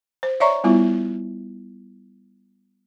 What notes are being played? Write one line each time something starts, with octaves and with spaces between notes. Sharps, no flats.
C5
C#5 D5 E5 A#5 C#6
G3 B3 E4 F4